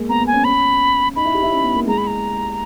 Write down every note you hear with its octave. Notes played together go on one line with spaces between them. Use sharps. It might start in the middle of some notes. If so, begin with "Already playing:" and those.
Already playing: G#3 A#3
B3 A#5
B3
G#5
C#4
C#4 B5
D#4 B5
E4
G4
E4
C#4
B3
A#3
G#3 A#5
B5
A#5